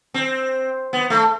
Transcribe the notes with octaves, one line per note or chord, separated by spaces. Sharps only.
C4
B3
A3